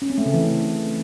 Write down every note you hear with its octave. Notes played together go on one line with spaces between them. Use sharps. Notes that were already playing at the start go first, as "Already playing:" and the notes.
C#4
C4
A3
C#3
E3